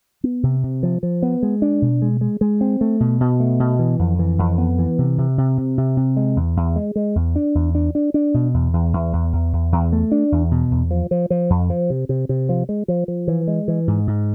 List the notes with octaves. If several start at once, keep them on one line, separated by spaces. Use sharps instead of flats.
B3
C3
C3
F3
F3
B3
G#3
D4
B2
G#3
G#3
G#3
C4
A3
B2
B2
A3
B2
E3
F2
E3
F2
B3
E3
C3
C3
C3
C3
C3
C3
G#3
E2
E2
G#3
G#3
E2
D4
E2
D4
D4
D4
B2
E2
E2
E2
E2
E2
E2
E2
A3
D4
E2
B2
E2
F3
F3
F3
F2
F3
C3
C3
C3
F3
G#3
F3
F3
E3
G#3
E3
G#2
G#2